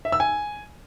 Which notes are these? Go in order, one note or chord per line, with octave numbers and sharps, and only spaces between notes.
E5
E6
G#5